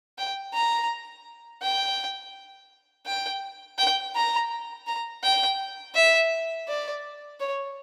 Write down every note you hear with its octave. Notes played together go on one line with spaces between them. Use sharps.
G5
A#5
G5
G5
G5
A#5
A#5
G5
E5
D5
C#5